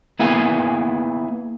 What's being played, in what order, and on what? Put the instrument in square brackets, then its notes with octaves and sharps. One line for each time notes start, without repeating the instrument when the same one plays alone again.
[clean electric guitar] A#3 B3 E4 G#4 F5 G#5